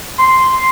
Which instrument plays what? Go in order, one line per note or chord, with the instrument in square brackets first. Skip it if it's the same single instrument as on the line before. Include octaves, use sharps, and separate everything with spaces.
[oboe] C6